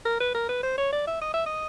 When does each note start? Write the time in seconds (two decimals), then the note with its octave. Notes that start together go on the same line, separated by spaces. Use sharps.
0.05 A#4
0.20 B4
0.35 A#4
0.49 B4
0.63 C5
0.78 C#5
0.92 D5
1.07 E5
1.21 D#5
1.34 E5
1.46 D#5